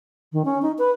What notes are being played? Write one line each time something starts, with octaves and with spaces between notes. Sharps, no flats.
D#3
C#4
D#4
B4